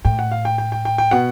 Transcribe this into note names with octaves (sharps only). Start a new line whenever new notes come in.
A2 G5
F#5
F5
G5
G5
G5
G5
G5
B2 F#5